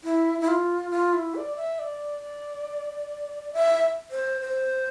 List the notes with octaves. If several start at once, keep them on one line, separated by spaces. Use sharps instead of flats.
E4
E4
F4
F4
E4
D5
E5
D5
E5
C5
C5